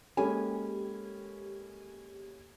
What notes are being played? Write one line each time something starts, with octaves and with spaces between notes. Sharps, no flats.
G#3 A#3 C#4 G4 A4 G#5 B5